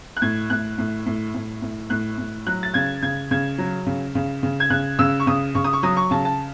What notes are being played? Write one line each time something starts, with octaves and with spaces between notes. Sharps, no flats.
F#6
A2 G#6
A2 F#6
A2
A2
A2
A2
A2 F#6
A2
F#3 F#6
A6
C#3 G#6
C#3 G#6
C#3 G#6
F#3
C#3
C#3
C#3
G#6
C#3 F#6
C#3 E6
C#6
C#3 D#6
C#3 C#6
D#6
C#6
F#3 D#6
C#6
C#3 A5
A5